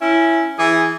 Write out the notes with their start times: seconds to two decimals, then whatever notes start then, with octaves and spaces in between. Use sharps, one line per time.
0.02 C#4 E4
0.59 E3 G#4